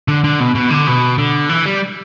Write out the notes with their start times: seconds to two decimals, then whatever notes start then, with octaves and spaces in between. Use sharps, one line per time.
0.08 D3
0.24 D3
0.40 B2
0.55 B2
0.70 D3
0.87 B2
1.18 D3
1.49 E3
1.66 G3